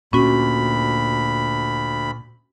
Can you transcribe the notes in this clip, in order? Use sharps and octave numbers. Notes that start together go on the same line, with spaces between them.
D2 A#2 C#4 F#4 B5